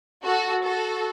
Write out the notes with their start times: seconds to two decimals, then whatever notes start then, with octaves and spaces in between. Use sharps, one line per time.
0.25 F#4 A4
0.63 F#4 A4